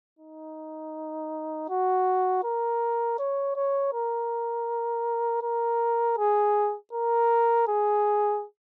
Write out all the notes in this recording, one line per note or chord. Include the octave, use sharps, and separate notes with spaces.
D#4
F#4
A#4
C#5
C#5
A#4
A#4
G#4
A#4
G#4